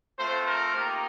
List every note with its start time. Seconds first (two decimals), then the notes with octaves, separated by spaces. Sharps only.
0.18 A3 C4 F4 C5
0.46 A#4
0.73 A#3 D#4 G4